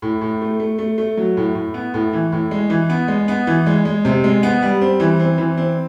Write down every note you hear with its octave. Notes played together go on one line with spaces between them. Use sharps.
A2
A2
A3
A3
A3
A3
F#3
A2
A2
B3
A2
E3
A2
G#3
E3
B3
G#3
B3
E3
G#3
G#3
C3
G#3
B3
G3
C4
E3
C4
E3
C4